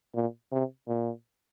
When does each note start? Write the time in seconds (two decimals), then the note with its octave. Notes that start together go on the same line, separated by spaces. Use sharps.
0.15 A#2
0.52 C3
0.88 A#2